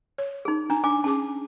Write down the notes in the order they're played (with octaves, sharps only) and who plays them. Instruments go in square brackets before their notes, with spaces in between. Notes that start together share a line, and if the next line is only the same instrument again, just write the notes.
[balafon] C#5
[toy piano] D#4 G#4
[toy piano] D4 [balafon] A#5
[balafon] D4 [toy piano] G#5 D6
[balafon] C#4 G#4 D6 [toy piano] A5